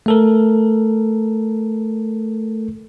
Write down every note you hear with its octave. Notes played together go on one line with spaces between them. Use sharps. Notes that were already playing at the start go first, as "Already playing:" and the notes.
A3 A4 A#4